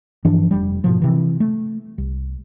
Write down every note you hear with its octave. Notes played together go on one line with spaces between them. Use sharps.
G2 E3 F3 D4
F1 G3
G#2 B2 F3
C3 E3
A3
C2